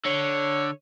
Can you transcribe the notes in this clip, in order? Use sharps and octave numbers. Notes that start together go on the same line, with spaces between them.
D3 C#5